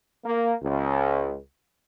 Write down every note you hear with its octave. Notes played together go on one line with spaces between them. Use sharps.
A#3
C#2